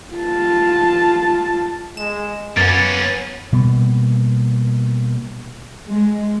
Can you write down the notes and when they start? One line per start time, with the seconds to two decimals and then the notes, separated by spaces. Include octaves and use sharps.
0.14 F4 A5
1.97 G#3 E7
2.57 F#2 A#3 B3 C#4 A6
3.53 B2 G3 A#3 B3
5.88 G#3